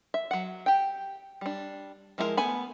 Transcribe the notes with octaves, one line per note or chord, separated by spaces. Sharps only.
E5
F#3 F#5
G4 G5
G3 D4
F3 G#3 E4 F#4 A#4
A3 B3 G#5 B5